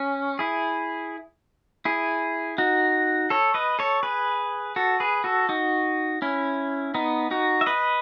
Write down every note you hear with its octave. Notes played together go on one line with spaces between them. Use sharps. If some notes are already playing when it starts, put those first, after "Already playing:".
Already playing: C#4
E4 G#4
E4 G#4
D#4 F#4
A4 C#5
B4 D#5
A4 C#5
G#4 B4
F#4 A4
G#4 B4
F#4 A4
D#4 F#4
C#4 E4
B3 D#4
D#4 F#4
E5
B4 D#5